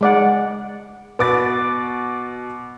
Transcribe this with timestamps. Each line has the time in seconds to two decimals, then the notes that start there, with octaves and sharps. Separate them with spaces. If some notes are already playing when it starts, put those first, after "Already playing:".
0.01 G#3 D5 F#5
1.19 B2 B4 D6 A6